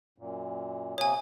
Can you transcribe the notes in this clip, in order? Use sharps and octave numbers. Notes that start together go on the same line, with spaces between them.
F#2 A#2
C3 A#3 C#5 G#5 D#6